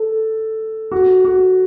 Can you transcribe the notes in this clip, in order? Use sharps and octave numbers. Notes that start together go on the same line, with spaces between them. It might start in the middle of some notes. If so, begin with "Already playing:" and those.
Already playing: A4
F#4
F#4